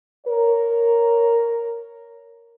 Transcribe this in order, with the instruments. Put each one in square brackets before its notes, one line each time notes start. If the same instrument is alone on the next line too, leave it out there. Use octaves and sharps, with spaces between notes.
[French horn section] A#4 C#5